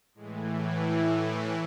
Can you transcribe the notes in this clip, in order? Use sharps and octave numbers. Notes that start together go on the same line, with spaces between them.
A2 E3 G#3
F#3
A3